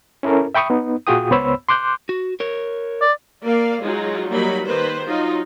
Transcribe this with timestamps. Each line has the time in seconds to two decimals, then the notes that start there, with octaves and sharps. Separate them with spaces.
0.23 C#4 E4 A4 A#4
0.55 E5 G5 B5 C#6 D#6
0.70 B3 D#4
1.07 A#2 F4 F#4 G#4 G5 D#6
1.31 C#2 B3 C5 C#5 B5 E6
1.69 C6 D6 F#6 G6
2.09 F#4
2.40 A#4 C#5
3.01 D5
3.42 A#3 D5 F5
3.83 F#3 G#3 D#4 F4
4.29 F#3 G3 A#3 D#4 B5
4.66 D#3 A#3 B4 C5
5.07 F#3 D#4 F4